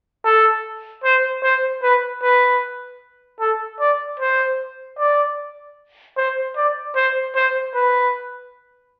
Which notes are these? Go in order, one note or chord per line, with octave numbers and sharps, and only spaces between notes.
A4
C5
C5
B4
B4
A4
D5
C5
D5
C5
D5
C5
C5
B4